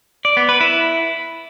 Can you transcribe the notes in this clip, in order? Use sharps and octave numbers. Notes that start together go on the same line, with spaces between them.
D5
B3
B4
E4